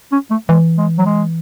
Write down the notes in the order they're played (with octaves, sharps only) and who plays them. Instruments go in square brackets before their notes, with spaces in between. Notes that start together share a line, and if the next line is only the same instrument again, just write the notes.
[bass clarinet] C#4
A3
[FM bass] E3 [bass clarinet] G#3
[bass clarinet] G#3
F#3
G#3